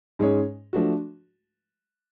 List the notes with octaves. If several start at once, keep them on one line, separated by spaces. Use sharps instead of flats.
G#2 G#3 C#4 G#4 C#5
F3 A3 D4 F#4